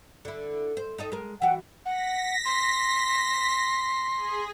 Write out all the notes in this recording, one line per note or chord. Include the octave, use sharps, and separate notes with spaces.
D3 E4
C5
D#4 A4 D#5
G#3 A#4
E3 F#4 F#5 G5
F#5 A#6 B6
C6
G#4